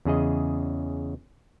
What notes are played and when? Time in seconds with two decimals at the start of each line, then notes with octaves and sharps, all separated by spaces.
0.05 E2 C#3 G#4 D#5